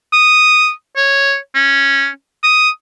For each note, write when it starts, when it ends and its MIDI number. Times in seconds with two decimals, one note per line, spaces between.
0.13 0.70 87
0.96 1.37 73
1.55 2.08 61
2.43 2.70 87